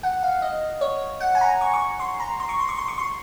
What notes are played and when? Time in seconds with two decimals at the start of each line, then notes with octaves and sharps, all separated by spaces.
0.03 F#5
0.23 F5
0.42 D#5
0.81 C#5
1.20 F#5
1.35 G#5
1.41 A#5
1.61 C#6
1.74 C#6
2.00 C6
2.20 A#5
2.40 C6
2.49 C#6
2.59 C6
2.69 C#6
2.78 C6
2.88 C#6
2.98 C6